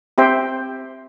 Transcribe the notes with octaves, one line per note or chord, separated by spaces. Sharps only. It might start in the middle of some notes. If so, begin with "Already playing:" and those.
C4 G4 C5 E5 G5